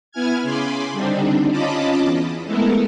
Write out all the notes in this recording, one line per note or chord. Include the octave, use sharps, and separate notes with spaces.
B3 E4 G#5 F6 G#6
C#3 G#5 B5 C6 D6
D3 G3 C4 D4 D#4
C#4 F4 D#5 A5 B5 D6
E2
G#3 A3 B3 E4 A4 A#4